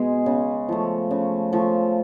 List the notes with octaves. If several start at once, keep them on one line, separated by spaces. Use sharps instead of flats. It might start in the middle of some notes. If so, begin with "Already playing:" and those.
Already playing: B2 G#3 G#4
C#3
F3 A3
C#3
F3 A3